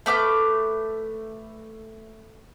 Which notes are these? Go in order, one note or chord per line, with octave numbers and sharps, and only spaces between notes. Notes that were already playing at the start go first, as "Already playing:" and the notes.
A3 B4 D6 F6